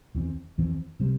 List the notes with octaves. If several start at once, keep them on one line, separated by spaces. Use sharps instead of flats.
E2 E3 C4
E2 E3 C4
C3 G3 C4